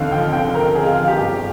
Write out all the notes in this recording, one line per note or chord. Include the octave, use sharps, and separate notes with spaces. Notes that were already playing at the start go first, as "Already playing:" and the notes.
Already playing: D#2 D3 C4 F5
F3 G5
D3 G5
C4 A#4
D3 G#4
F4
F3 F4
G4
G1 G4